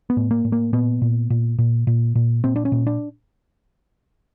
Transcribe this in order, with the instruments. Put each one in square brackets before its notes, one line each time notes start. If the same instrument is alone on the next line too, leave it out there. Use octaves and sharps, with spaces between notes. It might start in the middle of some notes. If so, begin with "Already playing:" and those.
[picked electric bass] B3
A2
A#3
A2
A#3
A#2 B3
A#2
A#2
A#2
A#2
A#2
A#2 C4
D4
C#4
A#2
D4